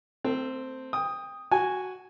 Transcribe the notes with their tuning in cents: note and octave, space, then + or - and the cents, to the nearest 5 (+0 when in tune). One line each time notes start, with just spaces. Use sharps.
A3 +25 C4 -5
G5 +25 D#6 +0
F#4 +0 G#5 -5